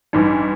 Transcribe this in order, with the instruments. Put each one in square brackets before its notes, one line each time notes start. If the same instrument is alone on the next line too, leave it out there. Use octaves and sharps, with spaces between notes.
[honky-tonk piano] A1 G2 E3 [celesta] D#4